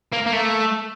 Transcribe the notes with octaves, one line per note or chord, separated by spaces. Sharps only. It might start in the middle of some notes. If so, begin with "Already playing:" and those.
A#3
A#3
A3